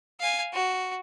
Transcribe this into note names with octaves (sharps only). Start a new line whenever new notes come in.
F5 G#5
F#4